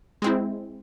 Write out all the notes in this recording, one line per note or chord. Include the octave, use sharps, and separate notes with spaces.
G#3 C4 E4